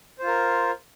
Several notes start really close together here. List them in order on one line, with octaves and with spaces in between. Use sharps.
C5 F4 A#4